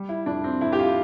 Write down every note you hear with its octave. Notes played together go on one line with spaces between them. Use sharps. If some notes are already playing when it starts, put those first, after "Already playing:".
Already playing: G3
E4
F2 D4
C4
F2 E4
G4
F4